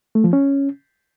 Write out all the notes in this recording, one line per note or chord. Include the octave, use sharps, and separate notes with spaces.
A3
F3
C#4